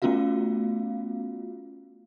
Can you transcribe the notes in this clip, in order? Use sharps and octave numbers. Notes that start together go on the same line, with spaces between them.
A3 B3 C#4 F4 F#4 F5